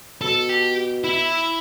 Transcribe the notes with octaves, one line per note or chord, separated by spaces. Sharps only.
B2 A4
G4
E4